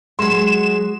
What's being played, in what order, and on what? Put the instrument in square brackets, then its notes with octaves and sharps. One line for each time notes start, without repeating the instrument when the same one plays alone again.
[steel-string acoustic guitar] F#3 G#3 [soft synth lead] G#4 [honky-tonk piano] C6 [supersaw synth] E7